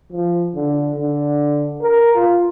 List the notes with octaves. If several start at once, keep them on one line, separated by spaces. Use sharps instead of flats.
F3
D3
D3
A#4
F4